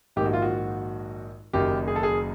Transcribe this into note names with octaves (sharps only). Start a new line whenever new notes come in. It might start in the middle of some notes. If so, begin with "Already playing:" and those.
A#1 G#2 D#3 G4
F#4
F4
F#4
F#1 F#2 D#3 G4
G#4
A4
G#4